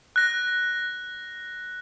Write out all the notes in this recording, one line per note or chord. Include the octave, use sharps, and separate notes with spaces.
F#6 A#6